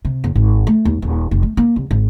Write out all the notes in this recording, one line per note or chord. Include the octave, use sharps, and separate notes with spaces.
C3
F#1
G#1
A3
D#2
D#1
F1
A3
A#3
C2
G#1